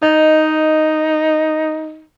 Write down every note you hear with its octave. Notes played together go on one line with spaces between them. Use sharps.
D#4 D#5